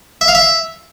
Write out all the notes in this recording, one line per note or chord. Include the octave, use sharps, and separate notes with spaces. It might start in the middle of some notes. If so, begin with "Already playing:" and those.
E5
F5
E5